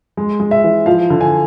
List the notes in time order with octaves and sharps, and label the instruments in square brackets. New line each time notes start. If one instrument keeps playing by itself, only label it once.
[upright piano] G#3
G#3
E5
E3
F3 F5
D3
G#5